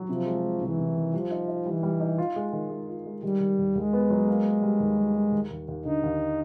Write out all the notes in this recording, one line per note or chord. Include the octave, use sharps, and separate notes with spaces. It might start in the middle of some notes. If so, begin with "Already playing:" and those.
Already playing: F#3
C3 F3
G#3
G#3
C2 E3
C2
D#3
F3 G3
D#4
D#4
E3 G3
G3
D#4
F4
G#3
D#3
G#3
F4
G#3
D#3 G3
D#3
D#2
D#2 G#3
B3
F#3
A#3
A#3
G3
D#2
G3
G3
D#2
D#2
D#2
D3 D#4
D#2